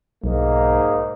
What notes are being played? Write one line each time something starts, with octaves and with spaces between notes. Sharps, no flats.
B1 G#2 A#3 D#4